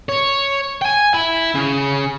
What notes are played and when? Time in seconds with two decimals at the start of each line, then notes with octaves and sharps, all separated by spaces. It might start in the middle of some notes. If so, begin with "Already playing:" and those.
0.09 C#5
0.82 G5 G#5
1.14 E4
1.55 C#3